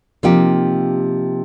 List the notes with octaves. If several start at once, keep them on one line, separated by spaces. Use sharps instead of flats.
C3 F3 A#3 D#4 G4